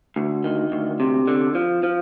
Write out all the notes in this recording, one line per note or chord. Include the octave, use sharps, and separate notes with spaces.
D2
D#3
D2
C3
D3
F3
F3